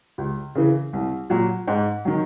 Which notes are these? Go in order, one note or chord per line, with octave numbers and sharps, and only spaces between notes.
C#2
C#3 E3
C2
A#2 F#3
G#2
D#3 F#3